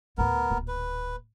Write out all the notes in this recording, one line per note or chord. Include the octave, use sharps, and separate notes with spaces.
D2 A2 B3 A#4
D1 A#2
B4